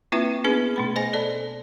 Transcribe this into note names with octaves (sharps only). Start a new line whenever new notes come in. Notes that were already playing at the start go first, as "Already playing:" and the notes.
A#3 C4 E4 F4 B4 E5
B3 C#4 D4 G#4 B4
B2 A3 B5
C5 D#5 G#5 A#6
A4 D5 A5